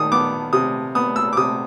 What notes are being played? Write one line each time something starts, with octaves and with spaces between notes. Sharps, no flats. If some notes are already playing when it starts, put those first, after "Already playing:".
Already playing: D#3 D#6
B3 D6
C3 D#6
B3 D#6
E6
D6
C3 D#6